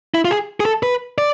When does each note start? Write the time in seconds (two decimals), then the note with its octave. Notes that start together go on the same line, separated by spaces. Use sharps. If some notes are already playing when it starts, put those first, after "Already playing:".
0.14 E4
0.25 F4
0.31 G#4
0.60 G#4
0.65 A4
0.83 B4
1.18 D5